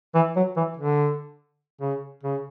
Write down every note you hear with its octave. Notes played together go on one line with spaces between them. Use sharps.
E3
F#3
E3
D3
C#3
C#3